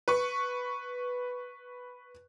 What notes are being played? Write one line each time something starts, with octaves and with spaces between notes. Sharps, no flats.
B4 C#6